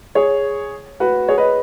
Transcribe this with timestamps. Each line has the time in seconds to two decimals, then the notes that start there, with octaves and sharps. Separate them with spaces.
0.15 G#4 C#5
1.00 F#4 B4
1.28 G#4 C#5
1.38 B4 D#5